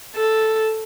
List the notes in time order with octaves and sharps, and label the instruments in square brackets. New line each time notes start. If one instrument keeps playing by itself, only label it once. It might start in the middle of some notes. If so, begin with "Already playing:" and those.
[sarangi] A4